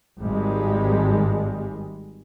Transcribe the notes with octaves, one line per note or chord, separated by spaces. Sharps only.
G#1 G3 G#3